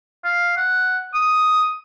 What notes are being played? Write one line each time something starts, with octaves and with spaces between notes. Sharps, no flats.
F5
F#5
D#6